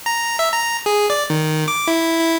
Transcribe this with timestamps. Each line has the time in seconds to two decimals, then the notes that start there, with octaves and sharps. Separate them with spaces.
0.06 A#5
0.39 E5
0.52 A#5
0.86 G#4
1.10 D5
1.30 D#3
1.68 D6
1.87 E4
2.19 E4